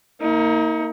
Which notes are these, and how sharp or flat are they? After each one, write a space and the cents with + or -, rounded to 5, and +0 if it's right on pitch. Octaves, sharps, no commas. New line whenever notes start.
A#3 -15 D#4 +40